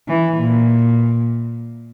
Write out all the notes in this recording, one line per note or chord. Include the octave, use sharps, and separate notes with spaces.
E3
A#2